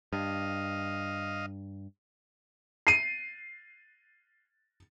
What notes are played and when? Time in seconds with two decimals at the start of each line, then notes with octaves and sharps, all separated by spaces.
0.13 G2 D#5 F5
2.87 C7 D#7